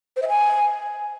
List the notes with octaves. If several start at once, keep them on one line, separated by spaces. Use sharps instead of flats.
C5
E5
G#5